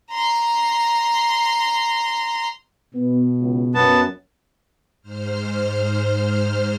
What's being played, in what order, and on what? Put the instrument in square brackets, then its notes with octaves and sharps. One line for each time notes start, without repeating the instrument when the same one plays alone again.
[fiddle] A#5 C6
[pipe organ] B2 [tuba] B3
[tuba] C#2
[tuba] F#2 [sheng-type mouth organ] B3 A5
[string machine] G#2 C5 F6